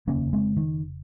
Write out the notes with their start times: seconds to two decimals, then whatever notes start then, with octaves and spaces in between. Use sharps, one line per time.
0.07 F1 D#2 C#3 A#3 C#4
0.33 G#3 C4
0.57 D#3